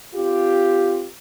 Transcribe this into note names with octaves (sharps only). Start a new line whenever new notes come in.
C4 F4 G4